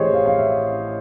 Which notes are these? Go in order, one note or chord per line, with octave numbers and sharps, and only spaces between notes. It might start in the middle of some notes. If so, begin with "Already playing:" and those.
Already playing: A1 A2 E3 G4 G#4 C5 C#5 D#5
F5
F5
E5